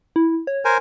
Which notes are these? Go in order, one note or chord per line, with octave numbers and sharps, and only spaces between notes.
E4
C#5
A#4 C5 G#5